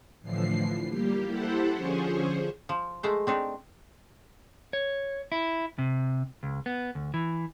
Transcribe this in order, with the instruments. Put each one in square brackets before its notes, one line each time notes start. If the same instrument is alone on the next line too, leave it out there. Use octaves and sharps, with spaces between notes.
[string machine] A2 D3 E3 F3 C7
G3 A#3 G4
E4 G4 A4 C5 F#5
D3 F3 C#4 G#4 C5 C#5
[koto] F3
G#3 A3 C5
C4 D4 D#4
[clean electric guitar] C#5
E4
C3
C#2
B3
D2
E3